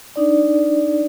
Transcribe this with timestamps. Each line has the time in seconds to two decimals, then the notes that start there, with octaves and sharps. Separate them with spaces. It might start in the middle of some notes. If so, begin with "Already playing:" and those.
0.16 D4 D#4 D5